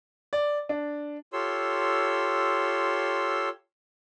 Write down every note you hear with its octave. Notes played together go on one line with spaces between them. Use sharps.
D5
D4
F4 G4 A4 C#5 C6 E6